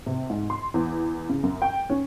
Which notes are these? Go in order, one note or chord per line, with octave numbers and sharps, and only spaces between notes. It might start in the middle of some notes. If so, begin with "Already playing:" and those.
C3
G#2
C6
E2
C#3
F#2
G5
C#4